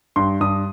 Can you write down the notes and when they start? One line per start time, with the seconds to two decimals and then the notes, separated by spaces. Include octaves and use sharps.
0.16 G2 C6
0.41 G2 D#6